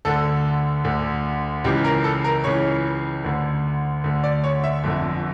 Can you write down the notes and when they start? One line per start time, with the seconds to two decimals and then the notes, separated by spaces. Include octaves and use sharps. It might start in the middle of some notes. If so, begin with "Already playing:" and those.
0.05 D2 D3 A4
0.84 D2 D3
1.64 C#2 C#3 E3 G4
1.84 A#4
2.04 A4
2.24 A#4
2.44 C#2 C#3 E3 C#5
3.24 D2 D3
4.04 D2 D3
4.24 D5
4.44 C#5
4.64 E5
4.84 G1 F2 D3